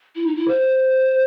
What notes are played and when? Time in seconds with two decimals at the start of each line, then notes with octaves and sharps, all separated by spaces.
0.16 E4
0.26 D#4
0.36 E4
0.48 C5